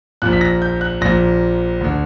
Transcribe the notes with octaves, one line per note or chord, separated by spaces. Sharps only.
A#1 A#2 F#6
B6
A#6
G6
F#6
A#1 A#2 A#6
D2 D3